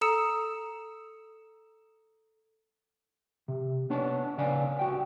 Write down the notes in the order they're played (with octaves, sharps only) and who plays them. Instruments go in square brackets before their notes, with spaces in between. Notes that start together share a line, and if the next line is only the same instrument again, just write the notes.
[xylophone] A4 A#5 D#6 E6 C#7 E7
[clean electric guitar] C3
B3 D4 C#5 A5
C#3 B4 D5 F5 G#5
C2 F#4 G5